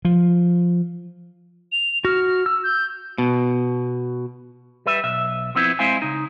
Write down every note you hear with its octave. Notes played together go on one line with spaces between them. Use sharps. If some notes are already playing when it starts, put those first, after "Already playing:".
F3
F7
F#4 F6
E6
G6
B2
G3 B4 E5
B1 E5
F3 B3 C4 E4
G#3 C4 E4 C5 F5 G#5
C#3 D#4